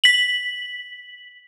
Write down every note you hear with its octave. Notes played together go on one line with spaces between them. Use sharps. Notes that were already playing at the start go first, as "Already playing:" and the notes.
B6 F#7